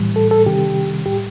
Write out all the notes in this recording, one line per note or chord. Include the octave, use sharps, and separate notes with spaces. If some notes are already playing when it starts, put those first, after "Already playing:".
Already playing: A2 E3 G3
A4
A4
C3 D#3 G3 G4
A2 G3 G4